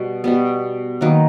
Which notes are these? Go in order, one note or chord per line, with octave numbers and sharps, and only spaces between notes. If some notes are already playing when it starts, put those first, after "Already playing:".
Already playing: B2 G3
B2 G3 B3
D#3 F#3 A#3 B4